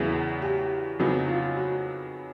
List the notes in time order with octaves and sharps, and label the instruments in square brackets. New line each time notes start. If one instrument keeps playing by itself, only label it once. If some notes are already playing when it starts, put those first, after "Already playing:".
Already playing: [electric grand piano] E2 C#3 F#3 B3 E4 [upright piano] G#4
[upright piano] G4
[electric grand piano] F2 C#3 F#3 B3 D#4 [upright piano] F#4
[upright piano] F4
F#4